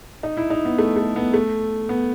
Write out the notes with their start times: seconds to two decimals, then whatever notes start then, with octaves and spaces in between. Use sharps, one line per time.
0.23 D#4
0.37 E4
0.50 D#4
0.65 B3
0.78 A3
0.96 A3
1.16 B3
1.34 A3
1.89 B3